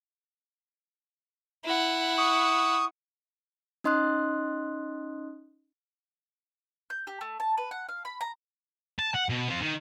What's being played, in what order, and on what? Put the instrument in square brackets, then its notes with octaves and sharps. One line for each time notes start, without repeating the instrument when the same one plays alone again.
[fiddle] E4 F#5
[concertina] C#6 D#6
[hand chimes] C#4 D#4 D#5 C6 D#6 F#6
[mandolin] G6
G4
A3
A5
B4
F#5
F5
B5
A#5
[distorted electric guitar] A5
F#5
B2
C4 F4
D#3